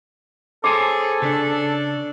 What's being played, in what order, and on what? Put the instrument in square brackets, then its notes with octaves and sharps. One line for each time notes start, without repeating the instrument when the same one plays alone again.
[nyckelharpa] G#4 [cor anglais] A4 [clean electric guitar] C5 C#5 G#5 [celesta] D6
[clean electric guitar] C#3 [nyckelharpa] D4